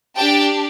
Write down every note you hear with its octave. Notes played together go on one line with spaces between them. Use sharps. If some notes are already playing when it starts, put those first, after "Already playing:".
D4 G4 G5 A5